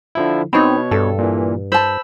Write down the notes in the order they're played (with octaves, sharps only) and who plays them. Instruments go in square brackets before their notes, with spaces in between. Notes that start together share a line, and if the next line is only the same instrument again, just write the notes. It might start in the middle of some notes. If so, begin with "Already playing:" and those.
[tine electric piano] D3 F3 E4
[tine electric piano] B2 C#5 [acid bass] C4 [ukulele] D#4 B5
[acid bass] G2 [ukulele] A4
[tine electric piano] A#2 E3
[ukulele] C5 A5 [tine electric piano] B5 E6